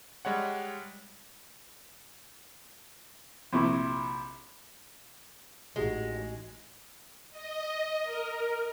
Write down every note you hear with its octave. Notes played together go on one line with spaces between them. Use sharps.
G3 G#3 C#5 F#5
A#1 C3 E4 C#6
A1 G#3 D#4 F#4 G4
D#5
A#4